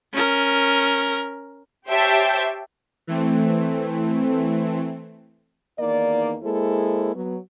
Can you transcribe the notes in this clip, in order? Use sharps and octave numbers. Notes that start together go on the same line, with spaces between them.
C#4 A#4
G4 C5 C#5 E5 G5 A5
E3 A3 C4
E2 D#3 A#3 D#4 D5
G#3 A#3 E4 G#4 A4 C5
F#3 B3